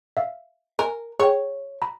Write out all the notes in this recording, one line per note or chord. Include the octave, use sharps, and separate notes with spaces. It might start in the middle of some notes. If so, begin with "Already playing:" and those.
E5 F5
A#4 G#5
G#4 C#5 G5
A#5 B5